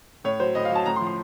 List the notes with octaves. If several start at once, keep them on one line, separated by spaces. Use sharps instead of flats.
A2 C#5
F#3 C5
A2 D#5
F5
F#3 A5
A2 A#5
C6
F3
C6